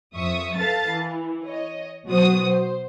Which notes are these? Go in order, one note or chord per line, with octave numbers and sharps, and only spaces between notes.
F2 E5 C#6 D#6
A4 B4 F5 A5 A6
E3
C#5 D#5
B2 F#3 F#4 C5 D#6
C5